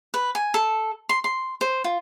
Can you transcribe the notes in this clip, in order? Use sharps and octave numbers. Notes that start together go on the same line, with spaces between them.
B4
G#5
A4
C6
C6
C5
F4